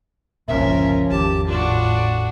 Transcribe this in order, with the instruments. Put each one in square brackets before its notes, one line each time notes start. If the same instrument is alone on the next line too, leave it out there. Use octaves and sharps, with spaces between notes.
[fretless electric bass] G1 C#2 A#2 [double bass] F3 C#4 [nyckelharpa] A#4 [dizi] E5
[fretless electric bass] G#1 E2 D#3 [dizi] G4 [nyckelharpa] A5
[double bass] A2 [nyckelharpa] D4 F#4 [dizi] F4